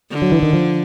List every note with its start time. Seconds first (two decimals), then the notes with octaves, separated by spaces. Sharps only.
0.11 D3
0.22 F#3
0.32 E3
0.43 D#3
0.53 F3